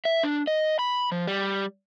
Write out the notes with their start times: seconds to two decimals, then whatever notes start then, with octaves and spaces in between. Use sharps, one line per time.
0.05 E5
0.23 D4
0.47 D#5
0.79 B5
1.12 F3
1.27 G3